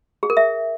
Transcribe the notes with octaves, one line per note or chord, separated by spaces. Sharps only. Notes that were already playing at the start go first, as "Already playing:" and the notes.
G#4
A#4
E5